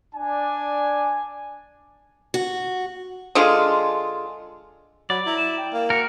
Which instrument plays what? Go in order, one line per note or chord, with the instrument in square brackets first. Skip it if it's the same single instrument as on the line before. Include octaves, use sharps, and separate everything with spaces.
[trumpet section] D4 D5 G#5
[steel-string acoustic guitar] F#4
[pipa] D3 G#3 F4
[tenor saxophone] F#3 [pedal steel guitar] D5 [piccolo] B5
[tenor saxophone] E4 [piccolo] A#5
[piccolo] E7
G5
[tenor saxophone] A#3
[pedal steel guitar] F#4 A#4 [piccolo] C#7